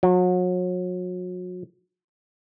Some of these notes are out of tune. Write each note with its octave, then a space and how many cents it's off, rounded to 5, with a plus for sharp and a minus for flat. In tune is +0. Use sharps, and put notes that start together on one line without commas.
F#3 -35